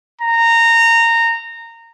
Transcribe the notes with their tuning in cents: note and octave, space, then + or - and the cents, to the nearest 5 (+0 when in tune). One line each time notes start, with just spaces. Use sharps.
A#5 -20